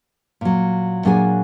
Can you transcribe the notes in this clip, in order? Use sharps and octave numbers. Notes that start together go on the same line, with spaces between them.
A#2 F#3
A#2 F#3 D4 G#4 G#5